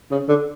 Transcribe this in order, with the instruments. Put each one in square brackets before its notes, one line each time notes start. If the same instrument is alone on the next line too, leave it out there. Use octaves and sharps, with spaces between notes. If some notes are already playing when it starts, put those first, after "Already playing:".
[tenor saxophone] C#3
D3